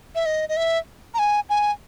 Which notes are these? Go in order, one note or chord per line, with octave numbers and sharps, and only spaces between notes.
E5
D#5
D#5
E5
A#5
G#5
G#5